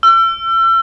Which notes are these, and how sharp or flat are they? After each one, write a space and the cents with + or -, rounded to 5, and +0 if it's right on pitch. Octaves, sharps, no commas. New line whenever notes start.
E6 +35